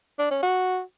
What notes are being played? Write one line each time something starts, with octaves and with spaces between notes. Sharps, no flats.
D4
C#4
F#4